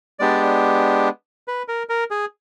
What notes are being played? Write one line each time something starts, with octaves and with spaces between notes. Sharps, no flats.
G#3 B3 D4 G4 D5
B4
A#4
A#4
G#4